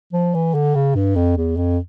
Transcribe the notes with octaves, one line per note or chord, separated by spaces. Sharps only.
F3
E3
D3
C#3
G2
F2
E2
F2